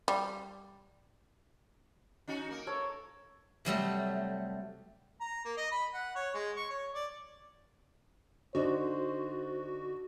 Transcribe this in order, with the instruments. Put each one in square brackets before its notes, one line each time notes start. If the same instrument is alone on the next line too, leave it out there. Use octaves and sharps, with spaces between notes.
[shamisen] G3
[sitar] C#4 D#4 F#4
A#3 A#4
[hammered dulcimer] A4 C#5
[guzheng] C3 F#3 G3 A3
[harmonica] A#5
A#3
D#5
B5
F#5
C#5
G#3
C#6
C#5
D5
[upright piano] D3 D4 D#4 [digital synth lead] F#4 [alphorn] C5